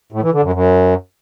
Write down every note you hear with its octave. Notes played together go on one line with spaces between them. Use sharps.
A2
E3
D3
F#2
F#2